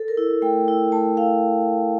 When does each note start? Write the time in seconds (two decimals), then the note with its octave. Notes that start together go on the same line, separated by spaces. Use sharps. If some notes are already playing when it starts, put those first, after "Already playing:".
Already playing: A4
0.08 A#4
0.17 E4
0.42 A3 G5
0.68 E4
0.92 A3 A5
1.17 E4 F5